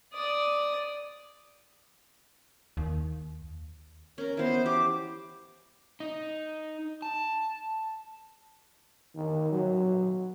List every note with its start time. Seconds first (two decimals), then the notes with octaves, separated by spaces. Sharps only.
0.14 D5 D#6
2.77 D#2
4.18 C#4 A#4
4.37 E3 B3 C5
4.66 G4 D6
6.00 D#4
7.02 A5
9.15 D#3
9.52 F#3